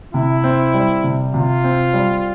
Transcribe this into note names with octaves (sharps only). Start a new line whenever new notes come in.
C3 E4
C4
G3
C3
C3 F4
C4
G3